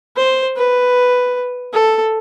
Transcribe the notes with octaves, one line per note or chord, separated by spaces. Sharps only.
C5
B4
A4